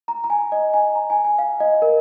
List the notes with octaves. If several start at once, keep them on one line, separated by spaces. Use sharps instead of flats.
A#5
A#5
G#5
D#5
G#5
A#5
G#5
G#5
F5
D#5
A#4